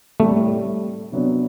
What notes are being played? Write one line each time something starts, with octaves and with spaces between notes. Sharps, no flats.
A2 G3 A3 C4
C3 F#3 B3 D4